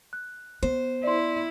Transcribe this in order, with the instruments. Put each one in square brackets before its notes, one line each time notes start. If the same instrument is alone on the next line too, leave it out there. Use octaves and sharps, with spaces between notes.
[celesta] F#6
[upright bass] B3 [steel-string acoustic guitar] C5
[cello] E4 [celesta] D5 C6